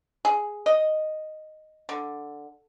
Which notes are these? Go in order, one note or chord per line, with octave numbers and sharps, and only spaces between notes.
G#4
D#5
D3